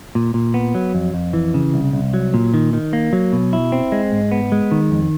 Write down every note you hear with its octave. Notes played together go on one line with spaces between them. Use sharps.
A#2
A#2
B3
F#3
F2
F2
E3
C#3
C2
C2
F#3
A#2
D#3
D#3
A#3
F#3
B2
E4
C4
G#3
G#2
B3
G#3
D#3
F2